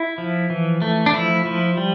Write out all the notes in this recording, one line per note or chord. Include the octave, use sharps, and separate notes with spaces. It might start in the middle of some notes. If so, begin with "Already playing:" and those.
Already playing: E4
F3
E3
A3
D4
F3 E4
F3
G3